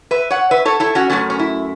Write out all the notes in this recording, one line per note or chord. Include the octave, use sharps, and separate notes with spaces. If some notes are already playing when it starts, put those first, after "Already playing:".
B4 E5
C#5 F#5
B4 E5
A4 C#5
E4 A4
C#4 F#4
F#2 C#3 A3 C#4
C#4
E4